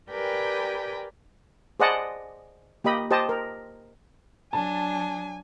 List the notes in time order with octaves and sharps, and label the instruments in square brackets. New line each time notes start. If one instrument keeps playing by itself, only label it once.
[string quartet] G4 A#4 B4 D5 G5 G#5
[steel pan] G#4 C5 D5 D#5 F#5 A5
A#3 G4 D#5 B5
G4 C5 D#5 A5
A#4
[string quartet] F#3 D4 [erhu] G#5 [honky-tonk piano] A5